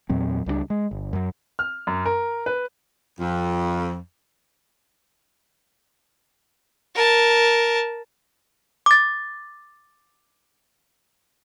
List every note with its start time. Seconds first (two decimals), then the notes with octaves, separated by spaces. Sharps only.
0.09 E2 A#2 F#3 C4
0.46 C#2 G3 G#3 D4
0.70 G#3
0.91 G1
1.13 F#2 F#3
1.59 F6
1.87 F#2
2.06 A#4
2.46 B4
3.20 F2
6.95 A#4 A5
8.86 D6 A6